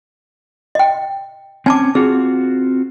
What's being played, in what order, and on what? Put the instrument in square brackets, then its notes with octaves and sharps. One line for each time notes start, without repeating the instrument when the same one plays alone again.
[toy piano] D#5 G5
[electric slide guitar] C4 C#4 [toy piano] G#5 A5 D6
[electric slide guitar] C4 F4 F#4 [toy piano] G#4